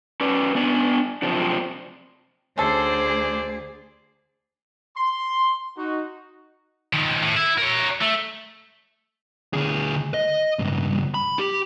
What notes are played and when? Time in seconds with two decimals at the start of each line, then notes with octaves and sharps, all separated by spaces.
0.21 C#4 B4 D5
0.55 B3 D4 D5 G#5
1.22 F#2 C3 F3 C4 D4
2.58 D2 C#4 G#4 A4 C5 D5
4.97 C6
5.77 D#4 F#4
6.93 D#3 F3
7.22 A2
7.36 E4
7.58 A#4 C#5
8.01 A3
9.54 D2 G#4
10.14 D#5
10.59 C#2 G2
11.14 B5
11.39 G4